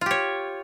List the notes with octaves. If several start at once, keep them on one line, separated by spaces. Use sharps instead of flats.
F4 G4 C#5